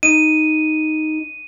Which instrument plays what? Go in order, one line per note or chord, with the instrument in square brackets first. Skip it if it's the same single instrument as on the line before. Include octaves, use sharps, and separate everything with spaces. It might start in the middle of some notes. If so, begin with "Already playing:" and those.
[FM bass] D#4 [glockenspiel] D#7